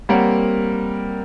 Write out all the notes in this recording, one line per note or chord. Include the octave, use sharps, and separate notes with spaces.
G3 A#3 C4 A#4 C#5 F#5